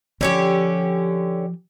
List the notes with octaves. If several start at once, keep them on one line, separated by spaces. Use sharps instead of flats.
D3 F3 C#4 G4